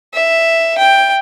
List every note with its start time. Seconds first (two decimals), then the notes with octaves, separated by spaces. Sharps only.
0.14 E5
0.78 G5